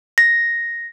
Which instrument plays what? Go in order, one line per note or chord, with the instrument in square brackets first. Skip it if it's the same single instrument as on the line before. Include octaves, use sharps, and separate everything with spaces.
[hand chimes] A#6